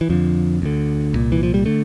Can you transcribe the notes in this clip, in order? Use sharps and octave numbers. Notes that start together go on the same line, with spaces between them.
E3
F2 D3 F3
D2 D3
C2 A#2
E3
F3
G3
D3 A3